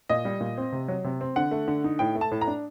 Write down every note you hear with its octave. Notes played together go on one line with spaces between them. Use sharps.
A#2 D#5
G3
A#2
C4
C3
F#3
C3
C4
D3 F#5
A3
D3
D#4
A2 G5
A3
A5
A2
A#5
D4